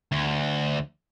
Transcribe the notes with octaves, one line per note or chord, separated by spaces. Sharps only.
D2